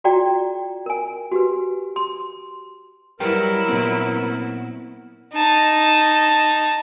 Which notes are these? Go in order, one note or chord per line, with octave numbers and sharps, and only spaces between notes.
F4 F#4 G#4 D5 G5 A#5
A#4 G#5
F#4 G4 B4
C6
F#3 G3 E4 A#4 B4 G5
A#2 B3 C4
D#4 A5